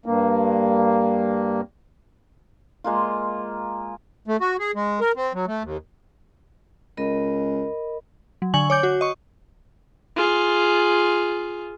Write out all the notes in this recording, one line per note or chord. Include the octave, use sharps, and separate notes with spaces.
G2 A#3
G#3 A#3 F4
A3
F#4
G#4
G#3
A#4
C4
F#3
A3
D#2
C#2 A#4 D#5 B5
F#3
D3 G#5 C#6 F#7
C#5 D6 G6
F#4
D#5 C#6
F4 G#4